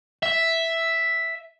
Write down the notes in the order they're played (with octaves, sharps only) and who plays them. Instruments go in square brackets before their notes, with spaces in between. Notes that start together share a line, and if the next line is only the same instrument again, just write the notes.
[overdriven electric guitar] E5